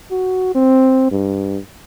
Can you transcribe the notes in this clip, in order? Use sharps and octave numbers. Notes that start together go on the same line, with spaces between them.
F#4
C4
G2